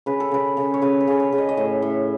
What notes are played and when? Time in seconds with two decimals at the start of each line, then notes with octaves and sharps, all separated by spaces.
0.06 C#3 B4
0.20 A4
0.31 C#3 B4
0.57 C#3
0.74 C#5
0.82 C#3 B4
1.00 B4
1.07 C#3
1.20 C#5
1.32 C#3
1.38 D#5
1.49 D#5
1.57 A2 E5
1.82 A2